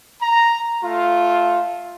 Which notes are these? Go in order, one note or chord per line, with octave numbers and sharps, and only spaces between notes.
A#5
A3 F4